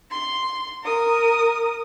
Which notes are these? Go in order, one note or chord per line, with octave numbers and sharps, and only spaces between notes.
C6
A#4 D#6